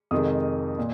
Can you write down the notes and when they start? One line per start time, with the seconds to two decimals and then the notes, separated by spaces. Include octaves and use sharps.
0.11 F2 C3 D#3 G#3 D#6
0.78 A#2